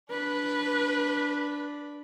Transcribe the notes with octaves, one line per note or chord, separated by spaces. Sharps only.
D4 B4 B5